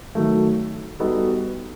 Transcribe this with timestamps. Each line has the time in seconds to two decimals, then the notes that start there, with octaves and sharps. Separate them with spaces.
0.15 D#3 F#3 A3
0.99 G3 B3 D#4 F#4 A4